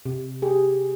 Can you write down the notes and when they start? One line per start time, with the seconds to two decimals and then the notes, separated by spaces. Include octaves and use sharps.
0.06 C3
0.42 G4 G#4